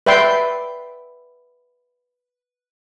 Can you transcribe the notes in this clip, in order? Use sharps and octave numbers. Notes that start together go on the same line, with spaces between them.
B4 D5 E5 G5 C6